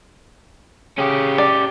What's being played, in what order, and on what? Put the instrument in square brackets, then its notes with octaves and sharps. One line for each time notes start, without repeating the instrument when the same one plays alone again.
[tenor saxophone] C#3 [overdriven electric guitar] C#4 G4
[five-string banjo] D5